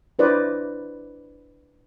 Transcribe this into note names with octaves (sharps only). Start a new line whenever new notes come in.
D4 E4 B4 C5 D5 D#5